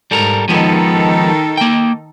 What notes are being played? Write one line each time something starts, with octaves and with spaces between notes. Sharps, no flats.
G#2 G3 A4 A#4
D#3 F3 G#3 B3 D#4 A4
A#3 G5